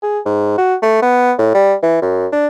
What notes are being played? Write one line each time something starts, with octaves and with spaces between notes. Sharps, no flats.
G#4
G#2
F#4
A3
B3
A2
G3
E3
F#2
D4